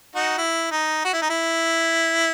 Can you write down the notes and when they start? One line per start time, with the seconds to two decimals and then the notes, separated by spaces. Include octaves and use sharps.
0.15 D#4 F#4
0.38 E4
0.72 D#4
1.05 F#4
1.13 E4
1.22 D#4
1.30 E4